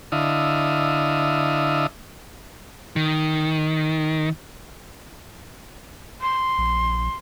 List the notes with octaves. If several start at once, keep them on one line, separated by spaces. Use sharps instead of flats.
D3 E4 D#5 F5
D#3
C6
A#1